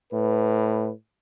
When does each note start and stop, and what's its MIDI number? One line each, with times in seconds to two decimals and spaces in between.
0.12 0.91 45
0.12 0.91 71